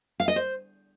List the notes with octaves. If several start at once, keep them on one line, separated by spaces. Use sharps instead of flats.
F5
D#5
C5